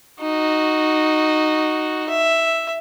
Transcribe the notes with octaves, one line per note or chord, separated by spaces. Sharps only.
D#4 F#4
E5